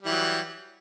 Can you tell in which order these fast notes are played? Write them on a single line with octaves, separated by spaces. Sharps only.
G3 E3 F#3